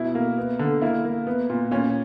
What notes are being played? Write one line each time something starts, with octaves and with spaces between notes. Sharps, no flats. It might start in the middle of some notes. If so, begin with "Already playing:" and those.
Already playing: B2 E4
A#3
B3
D3
A#3 E4
A#3
B3
A#2
A#2 C#4